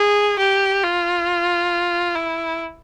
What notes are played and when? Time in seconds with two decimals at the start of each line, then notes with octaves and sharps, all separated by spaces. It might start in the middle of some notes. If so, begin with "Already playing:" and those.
Already playing: G#4
0.39 G4
0.83 F4
2.15 E4